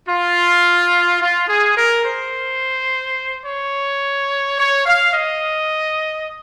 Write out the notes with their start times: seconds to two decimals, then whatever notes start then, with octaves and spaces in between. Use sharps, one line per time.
0.08 F4
1.21 F4
1.48 G#4
1.76 A#4
2.04 C5
3.44 C#5
4.58 C#5
4.86 F5
5.13 D#5